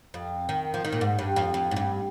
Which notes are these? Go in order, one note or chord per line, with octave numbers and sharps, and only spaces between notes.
F2
D#3
F3
D#3
A#2
G#2
G2
F2
F2
G#2
G2